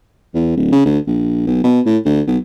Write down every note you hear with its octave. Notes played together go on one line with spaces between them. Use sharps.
E2
D1
C#3
D2
A#1
B1
B2
A2
D2
B1